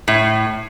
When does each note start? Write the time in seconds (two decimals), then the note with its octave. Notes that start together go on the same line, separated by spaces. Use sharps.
0.08 A2